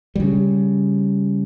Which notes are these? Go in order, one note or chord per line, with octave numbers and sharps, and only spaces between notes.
C#3 G3